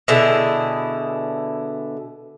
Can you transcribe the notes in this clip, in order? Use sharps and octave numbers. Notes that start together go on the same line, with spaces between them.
B2 D3 E4 G#4